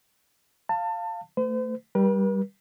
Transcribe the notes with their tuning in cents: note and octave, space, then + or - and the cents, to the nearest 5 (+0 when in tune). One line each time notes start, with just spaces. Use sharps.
F5 +0 A5 +25
A3 +25 C5 -45
G3 +0 B4 -45